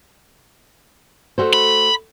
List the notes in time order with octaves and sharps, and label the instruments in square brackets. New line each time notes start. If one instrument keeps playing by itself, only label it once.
[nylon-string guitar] A3 F#4 C5
[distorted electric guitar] B5